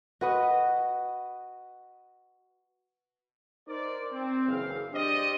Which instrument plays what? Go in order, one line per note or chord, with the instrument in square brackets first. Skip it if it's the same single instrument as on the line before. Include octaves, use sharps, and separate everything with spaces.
[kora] F#4 B4 D#5
[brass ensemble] D#4 A#4 C5 D5
C4
F#1 E3 G#4 F5
D4 G4 C5 D5 D#5